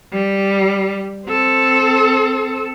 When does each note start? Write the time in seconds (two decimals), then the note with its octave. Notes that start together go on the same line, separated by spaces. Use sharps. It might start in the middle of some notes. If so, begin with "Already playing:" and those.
0.12 G3
1.27 C4 A4